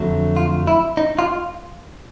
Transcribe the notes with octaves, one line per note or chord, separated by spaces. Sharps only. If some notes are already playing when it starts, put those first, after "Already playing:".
Already playing: F2 D3 F#3 A3
F4
E4
D#4
F4